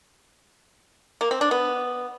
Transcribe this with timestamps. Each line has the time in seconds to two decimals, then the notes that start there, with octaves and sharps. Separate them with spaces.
1.21 A#3
1.31 C4
1.41 D4
1.51 B3